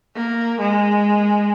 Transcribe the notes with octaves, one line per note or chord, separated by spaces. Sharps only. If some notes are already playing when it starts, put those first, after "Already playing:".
A#3
G#3